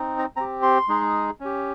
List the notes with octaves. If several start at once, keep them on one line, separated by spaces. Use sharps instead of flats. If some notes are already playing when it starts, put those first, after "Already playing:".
Already playing: C4 D#4
A#5
C4 G4 A#5
C6
G#3 D#4 G#4
C#4 G4